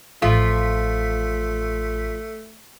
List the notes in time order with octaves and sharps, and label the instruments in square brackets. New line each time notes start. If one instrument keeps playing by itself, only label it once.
[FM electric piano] A1 B6 [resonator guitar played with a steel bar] F3 F4 [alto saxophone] A3